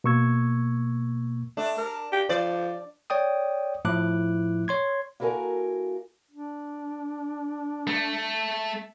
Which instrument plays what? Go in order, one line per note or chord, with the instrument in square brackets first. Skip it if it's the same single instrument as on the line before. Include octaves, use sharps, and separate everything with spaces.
[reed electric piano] B2 A#3 C#6 E6 G#6
[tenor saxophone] A3 [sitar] D4
[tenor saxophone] A#4
G4
[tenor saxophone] F3 [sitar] D5
[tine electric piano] C#5 D5 G5 D#6
A2 F3 E4 D6 F#6
C#5 C6 G#6
[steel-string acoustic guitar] A#3 E4 F#4 A4 A#4 G#5
[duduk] D4
[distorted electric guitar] A3